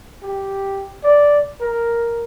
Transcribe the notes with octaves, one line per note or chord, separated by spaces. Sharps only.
G4
D5
A#4